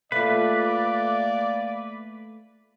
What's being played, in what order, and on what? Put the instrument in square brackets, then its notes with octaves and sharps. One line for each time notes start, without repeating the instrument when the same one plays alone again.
[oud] A3 F4 [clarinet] A#3 [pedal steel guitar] B4 [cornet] D5